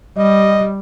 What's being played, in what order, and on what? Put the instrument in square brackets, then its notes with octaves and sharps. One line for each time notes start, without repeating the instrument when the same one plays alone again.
[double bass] G3 [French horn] D#5